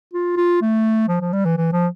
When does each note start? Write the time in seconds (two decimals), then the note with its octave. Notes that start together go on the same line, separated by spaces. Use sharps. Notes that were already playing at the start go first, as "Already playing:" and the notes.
0.13 F4
0.37 F4
0.62 A3
1.09 F3
1.21 F3
1.33 G3
1.45 E3
1.57 E3
1.73 F3